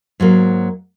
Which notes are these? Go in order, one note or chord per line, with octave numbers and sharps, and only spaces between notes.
G#2 F#3 A#3